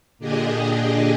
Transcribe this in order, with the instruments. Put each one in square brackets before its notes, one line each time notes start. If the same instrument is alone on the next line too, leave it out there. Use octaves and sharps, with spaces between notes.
[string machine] A#2 D3 D4 G4 G#4 D#5